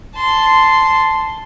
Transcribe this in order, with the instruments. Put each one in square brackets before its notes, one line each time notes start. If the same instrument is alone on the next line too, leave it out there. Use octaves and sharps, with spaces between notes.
[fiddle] A5 C6